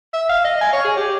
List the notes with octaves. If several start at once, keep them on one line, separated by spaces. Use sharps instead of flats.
E5
F5
D#5
G#5
C#5
G#4
G4